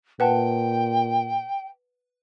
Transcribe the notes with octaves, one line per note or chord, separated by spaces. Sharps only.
A#2 B4 F#5 G5 A5